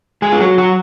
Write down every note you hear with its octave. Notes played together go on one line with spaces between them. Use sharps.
G#3 G#4
F4
F#3 F#4
F#3 F#4